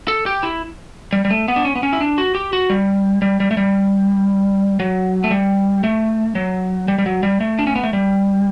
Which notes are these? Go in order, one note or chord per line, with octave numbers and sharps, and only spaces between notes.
A4
G4
E4
G3
G3
A3
B3
D4
C#4
B3
C#4
E4
D4
F#4
G4
F#4
G3
G3
G3
A3
G3
F#3
A3
G3
A3
F#3
G3
G3
F#3
G3
A3
D4
C#4
B3
A3
G3